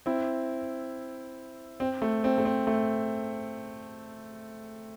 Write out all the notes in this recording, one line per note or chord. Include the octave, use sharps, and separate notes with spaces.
C4 E4
C4
A3
C4
A3
C4
A3